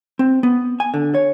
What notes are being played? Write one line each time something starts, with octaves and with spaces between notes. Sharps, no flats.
C4
B3
G#5
D3
C#5